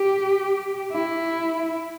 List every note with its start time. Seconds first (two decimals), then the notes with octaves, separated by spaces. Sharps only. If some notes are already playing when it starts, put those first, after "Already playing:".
Already playing: G4
0.93 E4